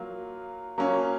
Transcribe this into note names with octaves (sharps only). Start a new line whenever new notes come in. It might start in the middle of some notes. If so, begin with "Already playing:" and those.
Already playing: F#3 A#3 F4
F#3 A#3 C#4 F4